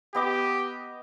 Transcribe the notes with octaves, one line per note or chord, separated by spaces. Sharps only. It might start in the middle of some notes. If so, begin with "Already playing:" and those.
B3 G4 D#5 D6